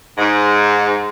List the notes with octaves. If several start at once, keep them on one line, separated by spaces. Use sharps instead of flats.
G#2